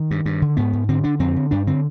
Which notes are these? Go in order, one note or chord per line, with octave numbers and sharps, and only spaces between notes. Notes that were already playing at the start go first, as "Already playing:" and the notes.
Already playing: D#3
G2
G2
D3
G#2 B3
G#2
D3 C4
D3 D4
F2 C4
D3
G2 D4
D3 C4